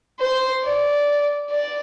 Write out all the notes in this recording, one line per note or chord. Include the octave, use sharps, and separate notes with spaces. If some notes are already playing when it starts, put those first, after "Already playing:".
C5
D5
D5